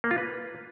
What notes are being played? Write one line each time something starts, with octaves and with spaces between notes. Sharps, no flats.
A#3
F4
B4